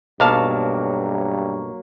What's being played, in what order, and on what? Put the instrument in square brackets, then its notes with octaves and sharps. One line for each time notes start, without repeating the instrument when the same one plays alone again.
[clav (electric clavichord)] B1 F5 A5 [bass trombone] G2 [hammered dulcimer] F#3 A#3